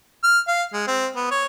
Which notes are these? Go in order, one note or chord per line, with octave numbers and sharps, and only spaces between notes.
F6
F5
G#3
C4
B3
C#5